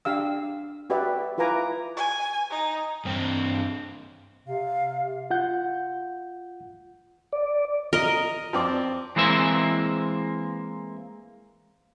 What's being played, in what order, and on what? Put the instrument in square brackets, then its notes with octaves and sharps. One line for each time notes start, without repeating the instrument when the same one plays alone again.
[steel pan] D4 G4 F5 E6
F#4 G4 B4 D5 E5
E4 F4 B4 G#5 A#5 D6
[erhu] G#5
D#4
[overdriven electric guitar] G2 C4
[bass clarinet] C3 [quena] F5
[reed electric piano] F4 F#5 G6
[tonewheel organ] D5
[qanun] A#4 D#5
[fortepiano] F3 C4 D5
[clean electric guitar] E3 G#3 A#3 C4 E5